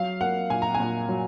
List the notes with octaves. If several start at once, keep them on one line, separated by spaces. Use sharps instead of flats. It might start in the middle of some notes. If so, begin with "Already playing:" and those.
Already playing: F#3 F5
A#3 F#5
A#2 G#5
A#5
G#5
A#2
F#3